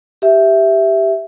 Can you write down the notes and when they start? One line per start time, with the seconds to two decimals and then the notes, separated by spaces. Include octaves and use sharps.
0.22 G4 E5